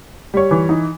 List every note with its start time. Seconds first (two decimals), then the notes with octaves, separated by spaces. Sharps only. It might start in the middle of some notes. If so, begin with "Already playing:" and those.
0.34 G3 C#5
0.51 E3
0.69 D#4